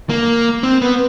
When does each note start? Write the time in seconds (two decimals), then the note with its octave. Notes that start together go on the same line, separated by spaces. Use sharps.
0.09 A#3
0.63 C4
0.81 B3